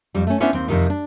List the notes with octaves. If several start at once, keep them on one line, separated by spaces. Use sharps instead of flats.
F2 G3
A3 C#4
B3 C#4 D4 E4 C5
D#2 C4
F2 C3 D#3
D4